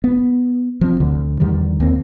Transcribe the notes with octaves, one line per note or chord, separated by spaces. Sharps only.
B3
F3 C4
D2 D3
E2 D3 D#3 G3
D#2 A#3 C4